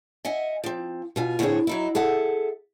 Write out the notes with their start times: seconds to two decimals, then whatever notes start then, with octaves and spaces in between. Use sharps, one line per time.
0.25 D#5 E5 F#5 G#5
0.64 F3 C4
1.16 B2 F4 G#5
1.39 A2 D3 A3 C4 G#4 C#5
1.67 F#3 D#4 E4
1.95 G#4 A4 E5 F#5